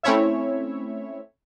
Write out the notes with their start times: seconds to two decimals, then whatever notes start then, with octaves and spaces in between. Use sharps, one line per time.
0.03 A3 C4 C#4 E4 C#5 E5